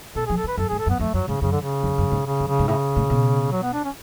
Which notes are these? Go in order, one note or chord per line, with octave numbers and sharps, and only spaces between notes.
B2 A4
F3 G#4
A4
C#3
B4
F#2 A4
G#2 G#4
A4
F#2
B3
F2 A3
F#2 F#3
G#2 C#3
F#2 C#3
D3
C#3
F2
F#2
G#2
C#3
F#2
C#3
G#2
A2 C#3
A2
B2
F#3
B3
D4
C#4